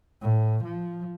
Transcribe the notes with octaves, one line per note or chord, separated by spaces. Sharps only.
A2
F3